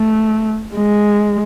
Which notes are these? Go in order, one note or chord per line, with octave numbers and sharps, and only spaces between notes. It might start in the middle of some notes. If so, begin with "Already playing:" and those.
Already playing: A3
G#3